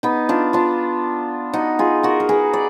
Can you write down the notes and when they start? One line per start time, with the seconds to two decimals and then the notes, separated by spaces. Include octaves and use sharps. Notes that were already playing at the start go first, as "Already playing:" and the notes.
0.03 B3 D#4
0.29 D4 F4
0.53 D4 F4
1.54 D#4 F#4
1.79 F4 G#4
2.03 F#4 A#4
2.20 A#4
2.29 G#4 B4
2.53 D5